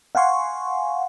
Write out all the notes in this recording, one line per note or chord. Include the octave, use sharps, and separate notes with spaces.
F5 F#5 G#5 C6 C#6